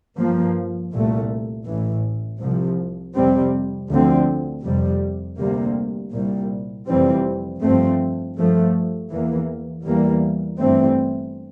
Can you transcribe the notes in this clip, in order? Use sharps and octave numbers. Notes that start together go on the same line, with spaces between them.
G2 F3 A#3
C2 A#2 A3
A1 A2 E3
C2 C3 F3
F2 C3 G3 C4
D2 D3 F3 C4
F1 F2 C3 G3
D2 C3 G3 A#3
C2 A#2 G3
F1 F2 E3 G3 C4
G2 F3 A3 C4
G2 F3 A3
E2 E3 A#3
E2 E3 G3 A#3
G1 G2 E3 A3 C4